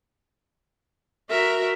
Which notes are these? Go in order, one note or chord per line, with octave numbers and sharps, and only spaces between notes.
F#4 A#4 E5